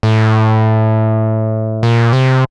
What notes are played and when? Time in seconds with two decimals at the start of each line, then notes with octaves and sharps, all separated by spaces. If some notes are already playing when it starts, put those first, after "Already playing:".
0.03 A2
1.83 A#2
2.13 C3